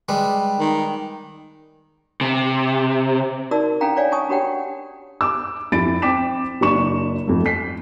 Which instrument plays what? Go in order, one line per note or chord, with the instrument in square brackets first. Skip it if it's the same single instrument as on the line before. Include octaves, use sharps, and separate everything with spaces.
[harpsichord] G3 G#3 B4
[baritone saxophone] D#3
[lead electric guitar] C3
[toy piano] D#4 F#4 A#4 D5 A5 E6
C#4 D4 A4 F5 G5 A#5
C#5 D5 F5 G#5
F5 G#5 A5 C#6 D#6
D4 F#4 G4 C#5 F#5 G5
[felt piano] D6 E6
F2 E4 B5 A6 D7
C4 G5 D6 B6 E7
F#1 D4 C#6 E7
F2 A3
B6 C7